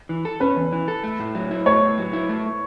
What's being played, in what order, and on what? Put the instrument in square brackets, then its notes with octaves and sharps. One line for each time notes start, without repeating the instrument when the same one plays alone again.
[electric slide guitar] E3
A4
[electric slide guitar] C#4 [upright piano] B4
[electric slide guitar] E2
E3
A4
A3
A2
F#3
E4
[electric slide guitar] A3 [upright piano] C#5
[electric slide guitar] A2
F#3
E4
A3